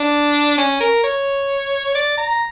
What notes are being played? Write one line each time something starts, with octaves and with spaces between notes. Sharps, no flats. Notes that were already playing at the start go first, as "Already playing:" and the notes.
Already playing: D4
C#4
A#4
C#5
D5
A#5